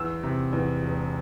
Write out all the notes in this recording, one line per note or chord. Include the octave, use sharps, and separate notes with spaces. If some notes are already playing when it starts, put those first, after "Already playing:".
Already playing: E2 E6
C3
E2
E1